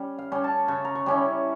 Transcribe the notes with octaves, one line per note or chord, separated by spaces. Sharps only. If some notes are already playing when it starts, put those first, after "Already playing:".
Already playing: G3 C#4
F5
G3 C#4
A5
C#3 C#6
A#5
C#6
G3 C#4 E4 D6